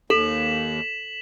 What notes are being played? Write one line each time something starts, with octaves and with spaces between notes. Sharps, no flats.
D#2 A4 B6 E7 F#7